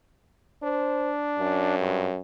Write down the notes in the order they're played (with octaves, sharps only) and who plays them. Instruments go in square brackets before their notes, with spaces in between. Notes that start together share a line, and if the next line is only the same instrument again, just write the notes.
[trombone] D4 [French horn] C5
[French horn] F#2
[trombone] G2